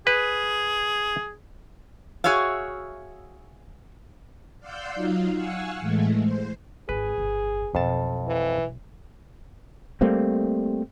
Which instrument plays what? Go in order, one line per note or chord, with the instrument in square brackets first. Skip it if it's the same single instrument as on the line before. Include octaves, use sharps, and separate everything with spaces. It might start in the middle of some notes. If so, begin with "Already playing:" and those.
[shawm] G#4 [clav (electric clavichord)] B4
[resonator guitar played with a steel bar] F#4 G#4 C#5 E5 F5
[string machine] D5 F5 F#5 C6 E6 G6
F#3 D#4 F4 F5
F5 F#5 G#5 C#6 E6
A2 E3 G#3 A3
C5
[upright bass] G#1 [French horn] G#4 [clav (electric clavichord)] B4
[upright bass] G1 F2
[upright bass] B1 E4 [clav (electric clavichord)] F2 A5
[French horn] E3
[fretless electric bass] G3 A3 A#3 C4